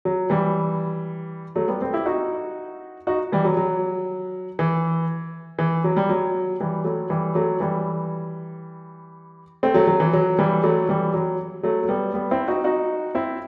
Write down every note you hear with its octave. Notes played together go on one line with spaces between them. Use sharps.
F#3
E3 G3
F#3 A3
G3 B3
A3 C4
E4 G4
D#4 F#4
D#4 F#4
E3 G3
F#3
F#3
E3
E3
F#3
G3
F#3
E3 G3
F#3 A3
E3 G3
F#3 A3
E3 G3
A3 C4
F#3 A3
F#3
E3
F#3
E3 G3
F#3 A3
E3 G3
F#3
F#3 A3
A3
G3 B3
G3 B3
C4 E4
D#4 F#4
D#4 F#4
C4 E4